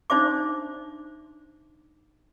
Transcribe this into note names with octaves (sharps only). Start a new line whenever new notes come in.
D4 D#4 C5 E5 D6